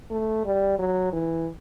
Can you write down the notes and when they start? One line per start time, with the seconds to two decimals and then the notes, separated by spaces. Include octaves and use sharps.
0.11 A3
0.46 G3
0.79 F#3
1.13 E3